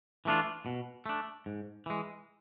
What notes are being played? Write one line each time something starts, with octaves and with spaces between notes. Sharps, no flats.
E3 A3 D4 F4
B2
A3 D4
G#2
E3 G#3